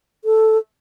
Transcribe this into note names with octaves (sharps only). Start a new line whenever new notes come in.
A4